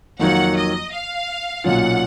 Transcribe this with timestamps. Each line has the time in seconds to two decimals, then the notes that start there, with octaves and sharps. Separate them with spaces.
0.20 F2 D#3 F#3 A#3 F#5
0.56 D#5
0.91 F5
1.64 B1 A#2 F#3 C#4 F4 F#5